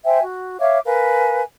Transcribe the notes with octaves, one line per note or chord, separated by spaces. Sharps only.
C5 E5 G5 G#5
F#4
C#5 E5 F5 D6
A#4 B4 F5 G#5